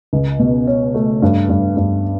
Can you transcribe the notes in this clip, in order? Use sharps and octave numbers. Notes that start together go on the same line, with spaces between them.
C#2
B2
C#4
A3
G2
G2
G2